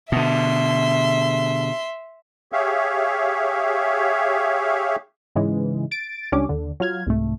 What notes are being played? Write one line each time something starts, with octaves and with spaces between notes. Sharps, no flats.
B2 D3 E5 C6
G4 G#4 C#5 E5 F5
G#2 C#3 E3 G#3
A6 D7
C#2 G3 C#4 D4 G4 D6
D#2 D3
F#3 F4 F6 G#6
C2 G#2 A3